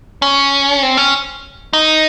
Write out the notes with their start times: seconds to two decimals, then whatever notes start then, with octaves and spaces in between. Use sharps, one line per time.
0.22 C#4
0.83 C4
0.97 C#4
1.73 D#4